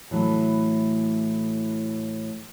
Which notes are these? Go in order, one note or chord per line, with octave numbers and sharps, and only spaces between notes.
A2 E3 F#3 A3